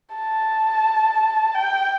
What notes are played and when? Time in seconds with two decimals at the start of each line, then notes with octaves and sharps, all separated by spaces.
0.16 A5
1.55 G5